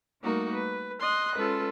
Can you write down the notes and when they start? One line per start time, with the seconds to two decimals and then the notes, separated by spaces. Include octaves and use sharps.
0.22 G3 A3 A#3 D#4 F#4 A#4
0.54 B4
1.02 D#5 C6 F#6
1.37 G#3 C#4 F4 A4 B4